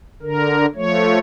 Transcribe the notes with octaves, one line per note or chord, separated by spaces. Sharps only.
D3 A#4
F3 A3 C#5